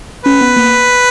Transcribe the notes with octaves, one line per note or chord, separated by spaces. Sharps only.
C#4 B4
B3
A#3